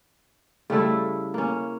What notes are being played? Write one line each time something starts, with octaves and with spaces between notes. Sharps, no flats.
C#3 G3 A3 E4
A#3 C#4